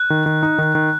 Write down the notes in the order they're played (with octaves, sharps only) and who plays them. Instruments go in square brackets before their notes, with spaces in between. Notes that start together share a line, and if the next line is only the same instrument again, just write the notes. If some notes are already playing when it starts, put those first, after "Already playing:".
Already playing: [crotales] F#6
[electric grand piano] D#3
D#3
D#4
D#3
D#3